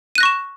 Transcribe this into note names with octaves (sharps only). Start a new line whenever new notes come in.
C#6 F#6 A#6 D#7 E7